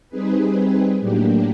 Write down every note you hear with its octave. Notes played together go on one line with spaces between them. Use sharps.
G3 C4 D#4 G#4 B4
A2 F#3 A#3 D4 G4